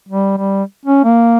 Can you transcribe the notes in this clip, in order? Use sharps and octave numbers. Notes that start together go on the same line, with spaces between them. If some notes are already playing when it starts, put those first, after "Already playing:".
G3
G3
C#4
A#3